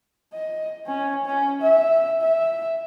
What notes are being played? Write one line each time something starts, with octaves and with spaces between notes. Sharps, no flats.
D#5
C#4
C#4
E5
E5